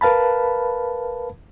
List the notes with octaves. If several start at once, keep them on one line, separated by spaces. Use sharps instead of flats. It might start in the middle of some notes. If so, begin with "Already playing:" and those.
A#4 B4 F5 A5 B5